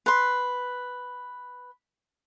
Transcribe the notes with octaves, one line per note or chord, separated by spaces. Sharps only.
B4 C6